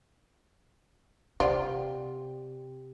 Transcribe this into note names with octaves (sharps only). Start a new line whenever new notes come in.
C3 F4 G4 C5 D5 F#5